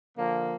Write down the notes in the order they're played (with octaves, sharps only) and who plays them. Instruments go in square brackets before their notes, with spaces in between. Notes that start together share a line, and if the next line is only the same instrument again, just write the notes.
[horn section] D3 F3 A#3